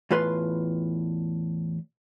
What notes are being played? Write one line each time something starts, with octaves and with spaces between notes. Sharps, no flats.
E2 A2 F4 B4 C6